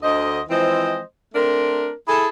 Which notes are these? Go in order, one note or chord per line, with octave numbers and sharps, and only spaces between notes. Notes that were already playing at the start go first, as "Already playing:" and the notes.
D2 D3 C5 D#5
E3 F3 G#3 C4 C5 D#5
A3 C4 D4 A#4
E4 G#4 A4